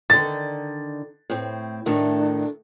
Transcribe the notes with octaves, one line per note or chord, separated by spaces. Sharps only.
D3 D#3 A6
A2 C4
A2 D#3 A3 D4